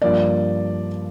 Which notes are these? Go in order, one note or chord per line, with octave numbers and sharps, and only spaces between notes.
G2 F3 A#3 D5